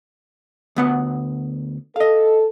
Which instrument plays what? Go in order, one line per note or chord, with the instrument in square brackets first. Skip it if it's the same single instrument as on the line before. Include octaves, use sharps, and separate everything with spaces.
[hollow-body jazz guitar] D2 B3 F#5
[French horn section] A4 [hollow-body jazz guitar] D#5 F5